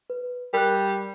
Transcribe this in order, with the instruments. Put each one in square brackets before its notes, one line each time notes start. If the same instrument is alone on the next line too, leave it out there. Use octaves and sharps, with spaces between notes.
[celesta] B4
[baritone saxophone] G3 [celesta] A#4 F#6